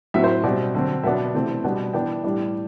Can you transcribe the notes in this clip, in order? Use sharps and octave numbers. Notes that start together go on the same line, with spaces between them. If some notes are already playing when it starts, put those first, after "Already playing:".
A2 F#3 C4 E5
C5
B2 G3 C4 D5
D3 F#3 C4
B2 F#3 B3 D4 E5
C3 E3 A3 C4
B2 G3 B3 D4
E3 B3 D4 G5
A2 G3 D4